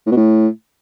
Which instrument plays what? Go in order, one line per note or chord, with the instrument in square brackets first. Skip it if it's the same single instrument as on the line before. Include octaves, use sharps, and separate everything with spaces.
[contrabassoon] A2
B2
A2